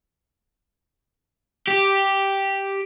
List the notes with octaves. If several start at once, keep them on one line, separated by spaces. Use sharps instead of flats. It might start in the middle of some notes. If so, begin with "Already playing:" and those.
G4